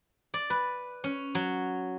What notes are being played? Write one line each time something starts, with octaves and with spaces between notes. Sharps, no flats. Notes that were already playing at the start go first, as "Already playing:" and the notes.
D5
B4
C#4
F#3